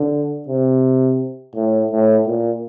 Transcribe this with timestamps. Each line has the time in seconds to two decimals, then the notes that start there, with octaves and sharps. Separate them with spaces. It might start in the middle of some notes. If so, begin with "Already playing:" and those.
Already playing: D3
0.48 C3
1.55 A2
1.91 A2
2.27 A#2